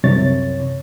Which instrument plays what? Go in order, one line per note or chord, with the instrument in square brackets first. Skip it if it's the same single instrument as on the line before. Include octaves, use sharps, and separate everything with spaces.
[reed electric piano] C2 F#2 C3 C#5 A6